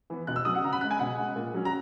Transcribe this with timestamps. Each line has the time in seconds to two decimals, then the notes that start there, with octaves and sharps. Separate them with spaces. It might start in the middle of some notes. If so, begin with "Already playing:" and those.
0.10 E3 B3
0.27 B2 F#6
0.36 E6
0.45 F#3 C#4 D#6
0.55 F#5
0.64 C#3 A#5
0.73 B5
0.81 G#3 C#4 F#6
0.91 G#5
0.99 B2 F#5
1.18 G#3 C#4
1.36 A#2
1.54 F#3 C#4
1.65 A#5